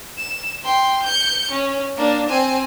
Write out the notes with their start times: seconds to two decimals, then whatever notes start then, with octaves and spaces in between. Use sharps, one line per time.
0.18 E7
0.64 G5 C6
1.03 G6 C#7
1.51 C#4
1.97 A#3 D4
2.29 C4 G#5